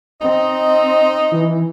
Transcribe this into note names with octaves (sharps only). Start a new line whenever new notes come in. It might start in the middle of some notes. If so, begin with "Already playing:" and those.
C4 D#4 D#5
E3